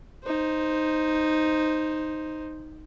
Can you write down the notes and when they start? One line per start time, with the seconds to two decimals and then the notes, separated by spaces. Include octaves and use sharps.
0.24 D#4 C5